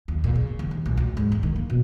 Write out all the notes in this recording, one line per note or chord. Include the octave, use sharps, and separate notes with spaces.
D#2
A#2
C#3
D#2
D#2
A#1
D2
G#2
E2
D#3
A#3
B2